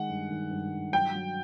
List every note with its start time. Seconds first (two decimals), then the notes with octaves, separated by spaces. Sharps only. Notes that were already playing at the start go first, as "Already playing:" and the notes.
Already playing: D#3 G#3 F#5
0.09 G2
0.30 D#3
0.51 G2
0.73 G2
0.93 F#3 G5
1.15 F#3